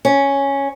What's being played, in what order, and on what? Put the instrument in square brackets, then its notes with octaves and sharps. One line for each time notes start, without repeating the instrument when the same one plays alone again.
[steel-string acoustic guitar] C#4